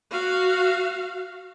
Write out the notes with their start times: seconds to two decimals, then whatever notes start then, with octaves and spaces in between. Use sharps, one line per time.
0.11 F#4 F5